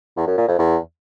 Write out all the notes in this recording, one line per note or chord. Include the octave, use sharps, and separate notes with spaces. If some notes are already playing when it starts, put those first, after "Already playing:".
E2
F#2
A#2
F2
E2